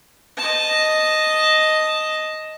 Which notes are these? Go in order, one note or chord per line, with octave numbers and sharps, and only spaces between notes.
D#5 A5